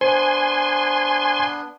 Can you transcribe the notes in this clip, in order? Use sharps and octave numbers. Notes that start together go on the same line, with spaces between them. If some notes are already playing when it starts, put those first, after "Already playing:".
B3 D4 C5 G#5 C6